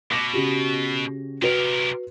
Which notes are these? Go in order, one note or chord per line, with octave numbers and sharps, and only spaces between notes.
B2 D6 A#6
C#3 F#4 G4
C3 F#4 A#4 B4